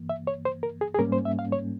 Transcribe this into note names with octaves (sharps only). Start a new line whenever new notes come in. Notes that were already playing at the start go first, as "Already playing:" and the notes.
Already playing: G2 E3 A#3
E5
C#5
C5
A#4
G#4
G#4
G#2 G3 A#3 C#4 A#4
C5
E5
F5
C#5